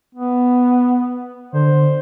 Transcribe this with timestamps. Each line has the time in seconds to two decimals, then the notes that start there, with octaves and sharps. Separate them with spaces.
0.15 B3
1.53 D3 C5